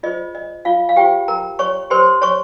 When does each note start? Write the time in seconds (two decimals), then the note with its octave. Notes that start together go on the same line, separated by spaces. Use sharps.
0.03 F4 G#4 C5 D#5
0.35 D#5
0.65 F4 F5
0.89 F5
0.96 F4 G4 G#4 C5 G5
1.28 A#4 A#5
1.59 C#5 C#6
1.90 G4 A#4 C5 C#5 C6
2.22 C#5 C#6